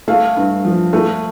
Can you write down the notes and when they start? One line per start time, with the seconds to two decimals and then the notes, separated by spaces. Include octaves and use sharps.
0.08 A3 F5
0.36 G2
0.65 F3
0.93 A3